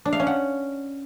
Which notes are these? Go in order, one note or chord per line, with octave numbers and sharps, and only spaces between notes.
D4
F5
C#4
F#5